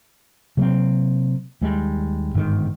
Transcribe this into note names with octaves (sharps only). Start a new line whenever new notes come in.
C3 F#3 A#3 C4
D#2 G3 G#3
G1 G#2 D#3